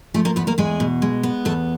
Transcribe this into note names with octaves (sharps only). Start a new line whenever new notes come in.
F3 A3 A4
A#3 A#4
E2 B3 B4
A#3 A#4
E2 G#3 G#4
B2
G#3
B3
E2 A3 A4